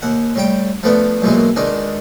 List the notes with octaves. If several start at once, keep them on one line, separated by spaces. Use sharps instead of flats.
D#2 F#5
A2 G3 G5
F3 A3 B3 D4
B1 F#2 A#2 E3 G#3
C#2 D#3 G#3 D4